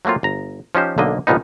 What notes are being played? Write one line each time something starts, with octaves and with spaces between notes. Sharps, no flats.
F#3 A3 A#3 C4 F4
G1 A#5
F3 C#4 D#4 G4 C5
B1 D3 A#3 D#5
G1 C2 A#2 F3 B3 D#4